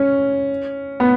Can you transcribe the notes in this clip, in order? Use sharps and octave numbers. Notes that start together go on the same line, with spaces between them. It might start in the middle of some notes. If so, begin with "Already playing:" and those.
Already playing: C#4
B3